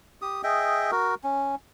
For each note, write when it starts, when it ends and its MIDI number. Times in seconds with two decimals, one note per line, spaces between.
0.22 0.42 67
0.22 0.42 87
0.43 0.91 68
0.43 0.91 75
0.43 0.91 76
0.43 0.91 79
0.91 1.15 66
0.91 1.15 70
1.23 1.55 61